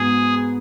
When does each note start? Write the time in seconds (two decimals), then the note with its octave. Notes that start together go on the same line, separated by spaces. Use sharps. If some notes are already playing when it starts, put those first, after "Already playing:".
Already playing: G#2 G#3 B3 F#4 G#4